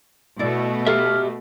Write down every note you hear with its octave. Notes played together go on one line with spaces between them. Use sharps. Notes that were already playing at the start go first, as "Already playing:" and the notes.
B2 A3 E4 D5
G4 A4 E5 F5 F6